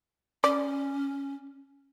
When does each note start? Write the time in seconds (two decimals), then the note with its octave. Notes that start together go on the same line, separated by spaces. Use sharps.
0.44 C#4 D5